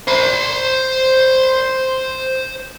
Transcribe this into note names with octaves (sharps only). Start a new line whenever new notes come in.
C5 B5